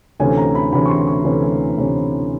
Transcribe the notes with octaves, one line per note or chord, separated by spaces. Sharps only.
D2 C3 E3 A3 C#4 G#5
A#5
B5
D2 C3 E3 A3 C#4 B5
C#6
C6
C#6
D2 C3 E3 A3 C#4
D2 C3 E3 A3 C#4